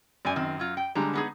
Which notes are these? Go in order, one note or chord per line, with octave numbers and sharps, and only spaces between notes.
F#2 D5 G#5
D#3 C4
F#3 F4
G5
D3 G3 G#3 A#5
B3 D#4 G#4